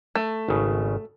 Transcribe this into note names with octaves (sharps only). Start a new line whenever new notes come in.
A3
G#1 C#3